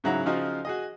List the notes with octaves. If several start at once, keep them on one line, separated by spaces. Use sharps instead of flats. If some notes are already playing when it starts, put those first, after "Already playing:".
G#2 C#3 F#3 E4 F#5 A#5
C#3 F3 D#4 F4 F#4
F#4 G#4 D#5